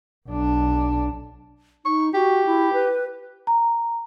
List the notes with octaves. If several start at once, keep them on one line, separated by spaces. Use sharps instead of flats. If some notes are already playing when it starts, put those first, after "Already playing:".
B1 D4
D#4 C#6
F#4 G4
E4
B4
A#5